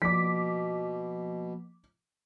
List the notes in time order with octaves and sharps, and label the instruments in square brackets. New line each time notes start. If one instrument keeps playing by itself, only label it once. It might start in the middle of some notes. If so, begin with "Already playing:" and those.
[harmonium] B2 [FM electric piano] F3 A#3 [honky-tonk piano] D6 B6